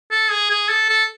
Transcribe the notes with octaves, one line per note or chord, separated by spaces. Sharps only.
A4
G#4
G#4
A4
A4